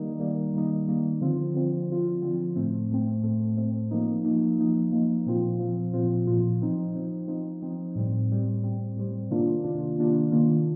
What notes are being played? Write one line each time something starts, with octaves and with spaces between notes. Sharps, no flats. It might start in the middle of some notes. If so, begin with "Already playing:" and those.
Already playing: D#3 G3 A#3 D#4
D#3 G3 A#3 D#4
D#3 G3 A#3 D#4
D#3 G3 A#3 D#4
D3 F3 C4 F4
D3 F3 C4 F4
D3 F3 C4 F4
D3 F3 C4 F4
A2 A3 C4
A2 A3 C4
A2 A3 C4
A2 A3 C4
F3 A#3 D#4
F3 A#3 D#4
F3 A#3 D#4
F3 A#3 D#4
A#2 F3 C4 F4
A#2 F3 C4 F4
A#2 F3 C4 F4
A#2 F3 C4 F4
F3 C4 D#4
F3 C4 D#4
F3 C4 D#4
F3 C4 D#4
A2 G3 C4
A2 G3 C4
A2 G3 C4
A2 G3 C4
C3 D#3 A#3 D4 F4
C3 D#3 A#3 D4 F4
C3 D#3 A#3 D4 F4
C3 D#3 A#3 D4 F4